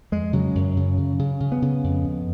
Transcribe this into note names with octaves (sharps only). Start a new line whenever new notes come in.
F2 G#3
C#3 F#3
F#2
C#3
C#3
C#3
C#3
B3
C#3
F2
F2